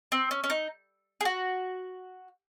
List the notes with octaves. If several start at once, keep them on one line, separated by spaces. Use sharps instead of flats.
C4
C#4
C#4
D#4
G#4
F#4